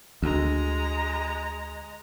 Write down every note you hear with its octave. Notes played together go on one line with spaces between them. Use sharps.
D2 G#3 A#5